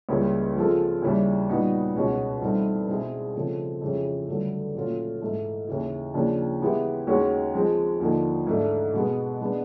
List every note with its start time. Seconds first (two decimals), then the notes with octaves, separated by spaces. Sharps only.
0.09 C#2 C#3 E3 G3 A#3
0.56 F3 G#3 C4 F4 A4
1.02 D#2 C#3 E3 G3
1.49 A#2 G3 B3 D#4 F#4
1.95 C#2 B2 G#3 C#4 F#4
2.42 G2 E3 A3 C4 D#4
2.88 B2 G#3 C4 E4 G#4
3.35 C#3 F3 A3 C4
3.81 F2 C#3 E3 G#3 C#4
4.28 G2 D3 F#3 A3
4.75 A#2 F#3 A3 C#4 F4
5.21 G#2 E3 A3
5.68 D#2 C#3 E3
6.14 D#2 C#3 F3 A#3 D4
6.61 E3 G#3 B3 E4 G4
7.07 D#2 D#3 G#3 C#4 F#4
7.54 F3 G#3 C4
8.00 D#2 D3 F3 A#3 D#4
8.47 G#2 E3 A3 D4
8.93 B2 G#3 B3
9.41 E3 G#3 B3 D4